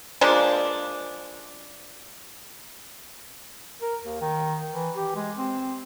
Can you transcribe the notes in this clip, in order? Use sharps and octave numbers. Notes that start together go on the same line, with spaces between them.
F3 G#3 A#3 D4
A#4
D#2
D#3
E3
G4
G#3
C4